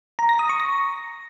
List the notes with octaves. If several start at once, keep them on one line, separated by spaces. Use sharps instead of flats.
A#5
A#6
D#6
C#6
A#6